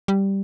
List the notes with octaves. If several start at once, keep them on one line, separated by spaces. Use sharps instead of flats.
G3